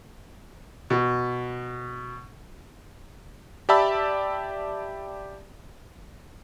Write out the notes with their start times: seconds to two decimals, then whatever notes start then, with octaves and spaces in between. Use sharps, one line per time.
0.90 B2
3.69 G4 D5 E5 A5 B5 E6